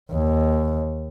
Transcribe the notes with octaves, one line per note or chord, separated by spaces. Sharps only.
D#2